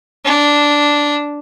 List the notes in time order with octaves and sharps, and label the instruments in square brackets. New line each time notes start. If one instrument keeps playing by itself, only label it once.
[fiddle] D4